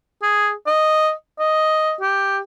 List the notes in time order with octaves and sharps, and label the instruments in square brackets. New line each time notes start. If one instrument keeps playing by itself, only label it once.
[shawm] G#4
D#5
D#5
G4